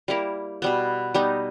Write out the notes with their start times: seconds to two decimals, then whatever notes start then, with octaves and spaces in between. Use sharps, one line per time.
0.08 G3 A#3 E4 A#4
0.62 B2 G3 B3
1.14 G3 B3 D#4